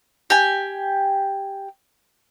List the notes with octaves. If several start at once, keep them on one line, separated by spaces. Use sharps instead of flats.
G4 G#5